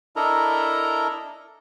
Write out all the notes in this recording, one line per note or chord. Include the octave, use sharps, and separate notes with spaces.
D4 E4 A4 A#4 D#5 A#5